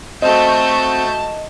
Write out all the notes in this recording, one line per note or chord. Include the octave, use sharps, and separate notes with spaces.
A3 C4 F#4 D#5 F5 A5 G6